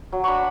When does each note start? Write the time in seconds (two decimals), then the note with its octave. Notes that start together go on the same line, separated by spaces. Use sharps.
0.12 F#3
0.24 D4 B5 C#6